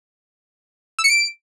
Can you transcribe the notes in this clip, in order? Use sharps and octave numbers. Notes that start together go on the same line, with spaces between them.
E6
C#7
D7